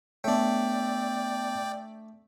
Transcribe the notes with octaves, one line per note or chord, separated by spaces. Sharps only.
A3 B3 D4 C#5 D5 G5